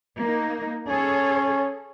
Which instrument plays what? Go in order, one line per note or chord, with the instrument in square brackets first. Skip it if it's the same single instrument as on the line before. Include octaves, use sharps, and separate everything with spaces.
[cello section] A#3 D#4
[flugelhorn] C#4 [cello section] G#4 A4 C#5